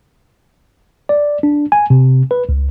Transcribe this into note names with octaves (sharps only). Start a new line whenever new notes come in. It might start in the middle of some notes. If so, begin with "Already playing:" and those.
D5
D4
G#5
C3
B4
C#2